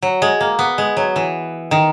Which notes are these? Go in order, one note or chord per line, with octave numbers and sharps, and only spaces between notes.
F#3
G#3
A#3
B3
G#3
F#3
E3
D#3